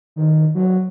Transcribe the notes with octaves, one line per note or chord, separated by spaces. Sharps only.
D#3
F#3